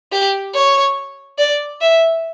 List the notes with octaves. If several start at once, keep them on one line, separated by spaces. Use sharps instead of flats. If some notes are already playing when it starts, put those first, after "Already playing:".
G4
C#5
D5
E5